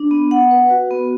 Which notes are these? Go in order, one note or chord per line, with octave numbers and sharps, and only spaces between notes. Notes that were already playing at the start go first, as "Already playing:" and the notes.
Already playing: D4
B3
F#5
B4
F#4
B3